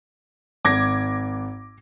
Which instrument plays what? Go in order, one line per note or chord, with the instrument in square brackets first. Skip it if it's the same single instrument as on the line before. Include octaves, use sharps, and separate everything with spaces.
[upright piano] G#1 [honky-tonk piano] D6 G#6 A#6